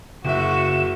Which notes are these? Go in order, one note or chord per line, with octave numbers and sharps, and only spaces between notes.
F#1 C#3 F#4 E5 E7